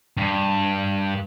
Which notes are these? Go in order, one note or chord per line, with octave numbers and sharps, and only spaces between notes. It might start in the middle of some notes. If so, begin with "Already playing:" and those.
G2